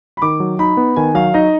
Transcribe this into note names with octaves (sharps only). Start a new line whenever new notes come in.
B5
D#3 D6
F#3
D#4 B5
B3
D#3 G#5
F#3 F5
D#4 D#5